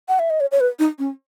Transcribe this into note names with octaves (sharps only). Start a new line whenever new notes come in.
F#5
E5
D#5
C#5
C#5
B4
D#4
C#4